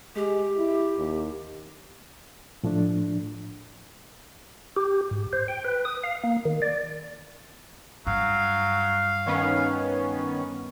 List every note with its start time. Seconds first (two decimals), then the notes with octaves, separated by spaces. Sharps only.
0.16 G#3 G4
0.57 E4
0.98 D#2
2.63 A2 F3 A3 D4
4.77 G4
5.11 G#2
5.33 C5
5.48 G5
5.65 B4
5.85 D#6
6.03 F5
6.24 A#3
6.45 D#3
6.62 D5
8.07 G2 F#3 F5
9.27 D#3 B3 C#4 C#5